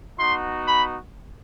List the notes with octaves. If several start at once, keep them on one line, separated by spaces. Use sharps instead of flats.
B3 D#4 F#4 C6
B5